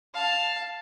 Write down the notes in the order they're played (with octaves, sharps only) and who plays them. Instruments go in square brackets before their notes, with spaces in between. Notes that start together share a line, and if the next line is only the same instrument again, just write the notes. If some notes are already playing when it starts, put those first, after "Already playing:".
[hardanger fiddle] F5 A5